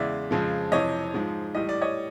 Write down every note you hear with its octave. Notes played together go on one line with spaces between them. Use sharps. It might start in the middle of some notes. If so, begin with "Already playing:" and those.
Already playing: E2 C#3 E3 G#3 D5 E5
F2 C#3 F3 G#3
F2 C3 E3 C#5 D#5
G#2 F3 G#3
A2 E3 G3 D#5
D5
C#5 D#5